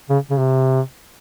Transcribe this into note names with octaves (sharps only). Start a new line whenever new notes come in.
C#3
C#3
C3